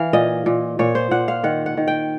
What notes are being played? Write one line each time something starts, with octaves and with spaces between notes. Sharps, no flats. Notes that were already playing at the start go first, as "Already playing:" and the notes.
Already playing: E3 F5
A#2 D#5
A#2
A#2 C#5
C5
A#2 F#5
F5
D#3 F#5
F#5
D#3
G5